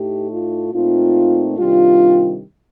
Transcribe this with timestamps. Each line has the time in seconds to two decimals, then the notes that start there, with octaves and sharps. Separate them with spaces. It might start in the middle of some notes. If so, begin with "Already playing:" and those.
Already playing: A2 A3 D#4 G4
0.30 F4
0.73 A#2 A3 C4 D#4 F4
1.58 C3 D#3 G3 D4 F4